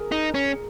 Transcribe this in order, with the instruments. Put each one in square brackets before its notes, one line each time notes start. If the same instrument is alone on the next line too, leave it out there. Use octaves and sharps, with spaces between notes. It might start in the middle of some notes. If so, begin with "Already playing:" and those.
Already playing: [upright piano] G#4 A#4
[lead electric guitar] D#4
C#4